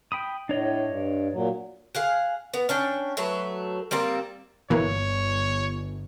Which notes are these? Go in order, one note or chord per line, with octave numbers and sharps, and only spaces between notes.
G5 B5 D#6
A2 D4 C#5 D#5
G2
A#2 F#3
G#4 F5 F#5
B3
C#4 D4 G5
F#3 A3 B4
G3 A#3 C4 D5
G1 B2 E3 A#3 C#5